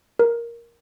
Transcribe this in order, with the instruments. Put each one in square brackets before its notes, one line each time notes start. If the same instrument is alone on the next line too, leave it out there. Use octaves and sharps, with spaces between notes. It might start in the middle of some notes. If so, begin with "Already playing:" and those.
[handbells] A#4